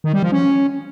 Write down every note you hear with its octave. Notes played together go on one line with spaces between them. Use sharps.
D#3
G3
F3
C#4